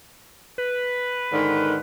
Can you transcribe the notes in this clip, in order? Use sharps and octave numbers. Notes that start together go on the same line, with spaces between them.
B4
G#2 D3 D#3